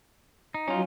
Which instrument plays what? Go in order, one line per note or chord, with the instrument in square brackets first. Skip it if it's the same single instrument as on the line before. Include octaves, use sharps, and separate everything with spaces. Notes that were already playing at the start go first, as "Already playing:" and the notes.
[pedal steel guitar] D#4
[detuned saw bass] F#3 [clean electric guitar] C#4 F4